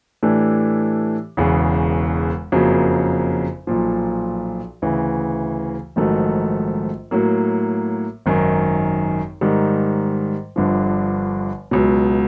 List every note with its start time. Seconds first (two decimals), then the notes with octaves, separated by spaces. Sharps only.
0.23 A2 E3 A3 D4 G4
1.37 E1 E2 C#3
2.52 F#1 F2 C#3 F#3 A#3
3.67 B1 A#2 F3
4.82 D2 C#3 E3
5.96 A#1 G#2 D#3 F#3 A3
7.11 A2 F#3 A#3
8.26 G#1 F#2 D#3
9.41 G#2 D#3 G3
10.56 G1 G2 D3 F3
11.71 C#2 B2 F#3